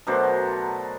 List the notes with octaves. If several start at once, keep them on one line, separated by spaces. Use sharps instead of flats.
B2 F#3 A3 D4 A#4 C5